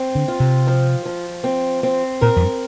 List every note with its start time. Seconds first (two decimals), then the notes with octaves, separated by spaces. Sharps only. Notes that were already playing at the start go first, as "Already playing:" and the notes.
Already playing: C4
0.15 D3
0.28 F4
0.40 C3
0.67 F3
1.05 F3
1.44 C4
1.83 C4
2.21 A#2 A#4
2.36 F2
2.40 G2